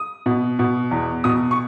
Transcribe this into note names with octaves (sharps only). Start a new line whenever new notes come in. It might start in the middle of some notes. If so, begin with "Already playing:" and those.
Already playing: D#6
B2
B2
E2
B2 D#6
C#6